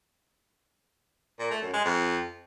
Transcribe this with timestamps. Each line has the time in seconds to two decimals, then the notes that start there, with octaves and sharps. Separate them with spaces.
1.39 A#2
1.51 A3
1.62 F#2
1.73 G#3
1.85 F2